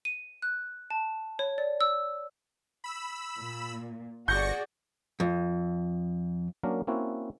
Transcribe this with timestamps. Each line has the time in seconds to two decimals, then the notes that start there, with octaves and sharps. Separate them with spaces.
0.05 D#7
0.42 F#6
0.90 A5
1.39 C#5
1.58 D5
1.81 E6
2.84 B5 E6
3.38 A#2
4.28 G1 F#4 G#4 D5 C#6 G6 A#6 C#7
5.20 F2
6.63 F#3 A#3 C#4 D4 A#4
6.87 A#3 C4 C#4 E4 F#4